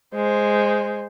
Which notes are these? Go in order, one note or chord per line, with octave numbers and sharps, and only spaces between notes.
G#3 C5